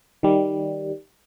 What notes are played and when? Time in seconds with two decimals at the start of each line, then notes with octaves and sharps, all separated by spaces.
0.23 D#3 G3